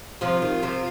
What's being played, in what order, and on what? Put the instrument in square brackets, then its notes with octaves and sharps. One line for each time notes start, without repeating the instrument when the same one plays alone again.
[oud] C3 F3 [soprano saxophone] F4
[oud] D#3
C3 F3